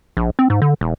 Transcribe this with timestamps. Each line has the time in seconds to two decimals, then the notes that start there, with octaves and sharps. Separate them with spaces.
0.17 A#1
0.39 C4
0.50 G#2
0.62 D3
0.81 E1